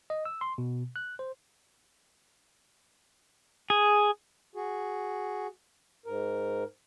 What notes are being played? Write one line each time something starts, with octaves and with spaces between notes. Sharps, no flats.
D#5
E6
C6
B2
F#6
C5
G#4
F#4 G#4
G#2 A#4